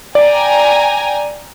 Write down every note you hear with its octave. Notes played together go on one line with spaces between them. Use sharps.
D5 G5 G#5 A#5